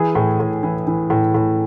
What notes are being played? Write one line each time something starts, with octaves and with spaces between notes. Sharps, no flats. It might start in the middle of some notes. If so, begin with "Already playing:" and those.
Already playing: E3 G#4
A2
A2
E3
E3
A2
A2